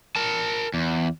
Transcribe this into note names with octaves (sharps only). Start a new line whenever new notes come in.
A#4 A5
E2